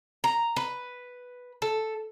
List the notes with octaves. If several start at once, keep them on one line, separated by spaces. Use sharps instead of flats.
A#5
B4
A4